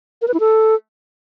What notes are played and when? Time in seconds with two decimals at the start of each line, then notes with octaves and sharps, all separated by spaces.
0.22 A#4
0.28 B4
0.34 E4
0.40 A4